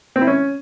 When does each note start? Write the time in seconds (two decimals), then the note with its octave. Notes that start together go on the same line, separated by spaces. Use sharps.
0.16 C4
0.21 E4
0.27 C#4